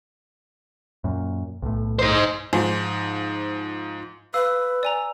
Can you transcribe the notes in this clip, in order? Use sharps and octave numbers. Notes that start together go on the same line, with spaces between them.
F#2 A#2
B1 A2
D#4 C5
G#2 F3
B4 F5 E6
D5 G#5 A#5